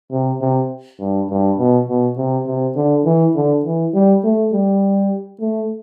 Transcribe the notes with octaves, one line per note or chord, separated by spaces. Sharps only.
C3
C3
G2
G2
B2
B2
C3
C3
D3
E3
D3
E3
G3
A3
G3
A3